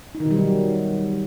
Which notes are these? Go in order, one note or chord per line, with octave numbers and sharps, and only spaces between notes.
D#4
D#3
B2
G3
F#3